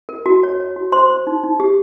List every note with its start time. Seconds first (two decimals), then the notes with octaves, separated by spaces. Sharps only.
0.09 A#4
0.26 F#4
0.43 C#5
0.60 C#5
0.76 F#4
0.92 C5 C6
1.10 C5
1.27 D#4
1.43 D#4
1.60 G4